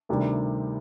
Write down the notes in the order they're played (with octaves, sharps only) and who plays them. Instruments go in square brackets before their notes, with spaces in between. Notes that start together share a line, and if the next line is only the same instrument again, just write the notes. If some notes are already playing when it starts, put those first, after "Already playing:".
[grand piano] D2 C3 D#3 G3